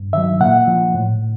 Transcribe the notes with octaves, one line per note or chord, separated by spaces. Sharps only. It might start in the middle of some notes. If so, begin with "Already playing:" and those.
Already playing: G2
D#3 F#3 E5
A#2 F#5
F3
A2